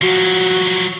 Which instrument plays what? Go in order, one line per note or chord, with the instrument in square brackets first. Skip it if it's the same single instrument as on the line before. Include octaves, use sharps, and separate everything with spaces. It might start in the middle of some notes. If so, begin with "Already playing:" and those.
[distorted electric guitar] F3 F#3 [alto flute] F#4